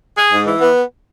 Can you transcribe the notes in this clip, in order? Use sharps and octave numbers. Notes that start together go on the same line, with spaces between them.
G#4
G#2
E3
B3